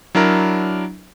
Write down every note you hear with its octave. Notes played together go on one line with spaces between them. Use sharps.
F#3 D4 E4 A#4